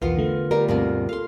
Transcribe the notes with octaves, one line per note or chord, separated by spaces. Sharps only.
B1 E2 E3 B3 F4 A#4 B4
D3 A3
G3 F4 A#4
D2 G2 B2 A#3 C4 A#4
A4 F5 C6